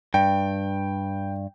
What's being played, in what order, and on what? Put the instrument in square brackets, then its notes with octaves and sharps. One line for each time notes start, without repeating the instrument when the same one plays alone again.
[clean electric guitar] G2 [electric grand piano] G5